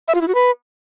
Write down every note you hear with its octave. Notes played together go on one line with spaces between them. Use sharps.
E5
F4
E4
F#4
B4